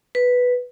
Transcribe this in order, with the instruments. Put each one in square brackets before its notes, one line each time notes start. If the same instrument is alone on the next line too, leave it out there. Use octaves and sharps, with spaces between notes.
[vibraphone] B4